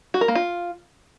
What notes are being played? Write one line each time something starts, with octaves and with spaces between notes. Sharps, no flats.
F#4
A#4
A#3
F4